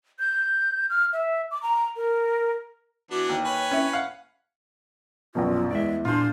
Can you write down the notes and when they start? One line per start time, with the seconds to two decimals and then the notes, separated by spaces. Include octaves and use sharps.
0.19 G6
0.90 F6
1.13 E5
1.51 D6
1.63 A#5
1.96 A#4
3.11 E3 B3 D4 F#4 D6
3.29 D#2 G5
3.45 B4 C#5 G#5
3.71 C#4 E4
3.93 F5 F#5
5.35 A#1 F#2 B2 F4
5.71 E2 G#3 D5 E5
6.05 A#2 D4 F4 G#4 C5